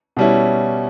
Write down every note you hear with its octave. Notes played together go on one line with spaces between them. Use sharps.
B2 G3 C#4 E4